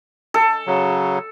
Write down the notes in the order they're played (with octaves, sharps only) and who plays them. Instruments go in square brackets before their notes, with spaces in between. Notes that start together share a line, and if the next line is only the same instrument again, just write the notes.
[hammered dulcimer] A4
[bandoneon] C#3 F#3